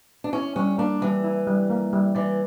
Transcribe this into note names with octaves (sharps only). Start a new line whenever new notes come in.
D4
C#4 E4
G3 C#4
A#3 D4
E3 G3
E4
G3
A#3
G3
E3 D5